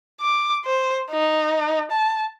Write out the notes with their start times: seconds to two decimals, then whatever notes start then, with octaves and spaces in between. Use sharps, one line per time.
0.21 D6
0.65 C5
1.11 D#4
1.91 A5